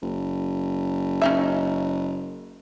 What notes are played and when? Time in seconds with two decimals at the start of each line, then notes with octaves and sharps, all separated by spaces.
0.02 F#1
1.22 C#4 D#4 E5